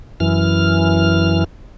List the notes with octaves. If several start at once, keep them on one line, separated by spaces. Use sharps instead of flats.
F#2 E3 F6